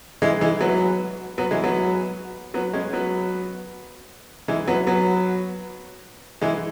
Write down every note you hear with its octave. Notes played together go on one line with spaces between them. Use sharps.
E3 G#3
E3 G#3
F#3 B3
F#3 B3
E3 G#3
F#3 B3
F#3 B3
G#3 C#4
F#3 B3
E3 G#3
F#3 B3
F#3 B3
E3 G#3